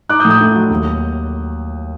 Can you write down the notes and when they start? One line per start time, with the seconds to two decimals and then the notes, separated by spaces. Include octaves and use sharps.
0.09 D#4 D6 F#6
0.20 D#6 G6
0.25 A2
0.30 D#6 G6
0.41 A3
0.55 F#3
0.70 D#2